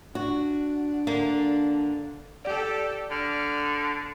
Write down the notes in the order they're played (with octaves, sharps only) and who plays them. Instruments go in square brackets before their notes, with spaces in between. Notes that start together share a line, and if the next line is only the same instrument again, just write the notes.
[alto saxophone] D4 [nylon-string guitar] F#4
[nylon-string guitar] D3 [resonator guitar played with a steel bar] A#3
[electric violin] G4 A4 [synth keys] D5
[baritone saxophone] D3 [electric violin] F6